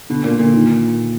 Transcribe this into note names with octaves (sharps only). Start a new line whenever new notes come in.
B2 D3
A#2 A#3
A#2 D3
D#3